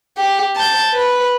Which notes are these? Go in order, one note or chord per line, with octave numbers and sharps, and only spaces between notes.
G4
A5 G6
B4